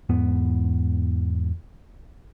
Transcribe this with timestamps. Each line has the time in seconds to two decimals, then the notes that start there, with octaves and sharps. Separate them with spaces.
0.09 E2 G#2 B3